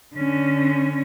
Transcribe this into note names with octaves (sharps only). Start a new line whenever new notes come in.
D3 C#4